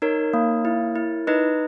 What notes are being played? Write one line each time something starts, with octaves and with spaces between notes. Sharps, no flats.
D#4 A#4 C#5
A#3
E4
E4
D#4 B4 D#5